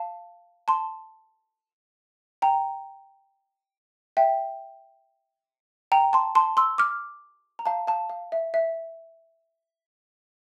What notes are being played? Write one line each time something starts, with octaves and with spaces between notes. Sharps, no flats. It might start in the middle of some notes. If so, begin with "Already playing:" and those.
Already playing: F5 A5
A5 C6
G5 A#5
E5 G5
G5 A#5
A5 C6
A5 C6
C6 E6
D6 F6
A#5
F5 A5
F5 A5
F5
E5
E5